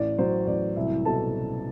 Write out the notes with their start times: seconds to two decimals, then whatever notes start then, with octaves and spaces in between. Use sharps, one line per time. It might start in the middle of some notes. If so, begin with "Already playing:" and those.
Already playing: A1 D5
0.18 F#3 C5
0.47 A1 D5
0.76 C2 E4 E5
1.05 B2 A4 A5